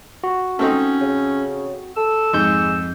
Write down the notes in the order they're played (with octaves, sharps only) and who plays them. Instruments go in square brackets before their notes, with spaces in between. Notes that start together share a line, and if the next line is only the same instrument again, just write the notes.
[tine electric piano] F#4
[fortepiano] A3 C4 D#4 [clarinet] C#4
[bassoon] C#3
[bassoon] A4 [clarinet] E6
[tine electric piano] F2 G6 [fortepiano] G#2 [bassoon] G#3